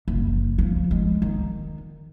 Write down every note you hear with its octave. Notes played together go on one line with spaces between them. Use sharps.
F#1
F3
G#3
D#3